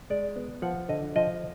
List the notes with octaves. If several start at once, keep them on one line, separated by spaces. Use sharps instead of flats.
G#3 D5
B3
F3 F#5
D3 D#5
F3 D#5